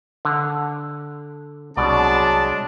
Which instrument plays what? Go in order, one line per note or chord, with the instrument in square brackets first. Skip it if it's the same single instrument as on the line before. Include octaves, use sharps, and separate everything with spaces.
[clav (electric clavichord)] D3
[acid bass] C2 [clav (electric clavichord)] B2 [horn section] F#3 D5 [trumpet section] G#3 D4 A5